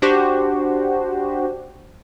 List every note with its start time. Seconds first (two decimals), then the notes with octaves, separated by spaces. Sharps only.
0.02 D4 F#4 G4 C5